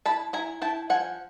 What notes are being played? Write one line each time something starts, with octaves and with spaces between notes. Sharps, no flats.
E4 A5 B5
E4 G#5 A#5
E4 G5 A5
F3 F#5 G#5